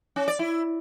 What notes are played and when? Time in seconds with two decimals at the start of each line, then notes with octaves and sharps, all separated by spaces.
0.16 C#4
0.28 D5
0.39 E4